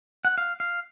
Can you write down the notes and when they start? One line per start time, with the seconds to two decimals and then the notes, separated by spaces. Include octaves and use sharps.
0.25 F#5
0.38 F5
0.60 F5